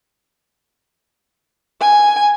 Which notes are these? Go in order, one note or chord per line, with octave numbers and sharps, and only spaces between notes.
G#5